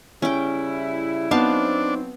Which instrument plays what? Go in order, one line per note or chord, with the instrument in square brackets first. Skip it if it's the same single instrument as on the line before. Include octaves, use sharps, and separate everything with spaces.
[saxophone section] C#3 G3 E4 [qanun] C#4 G5
[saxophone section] F#3 C4 [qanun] B3 F5 A5 [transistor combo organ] D4 [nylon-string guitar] D#4